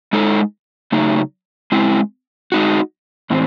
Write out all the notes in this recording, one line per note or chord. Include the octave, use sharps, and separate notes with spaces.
G#3 D#4 A4
C#3 F#3 A3 D#4
G#3 C4 E4
G#3 D#4 F#4
A2 E3 C4